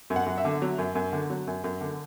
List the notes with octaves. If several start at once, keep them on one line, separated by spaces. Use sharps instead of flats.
F#2
F#5
F#2
E5
D3
F#3
F#2
F#2
D3
F#3
F#2
F#2
D3